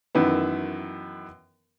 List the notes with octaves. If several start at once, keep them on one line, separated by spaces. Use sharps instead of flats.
F#2 D#3 E3 B3